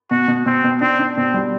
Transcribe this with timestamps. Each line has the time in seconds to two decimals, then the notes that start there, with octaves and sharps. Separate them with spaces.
0.10 B2 F#4
0.28 B2
0.46 B2 C4
0.64 B2
0.81 C4 D4
0.99 D4
1.17 B2 C4
1.34 G3